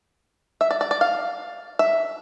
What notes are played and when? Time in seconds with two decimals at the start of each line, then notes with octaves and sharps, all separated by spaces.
0.61 E5
0.71 D5
0.81 D5
0.91 D5
1.01 F5
1.79 E5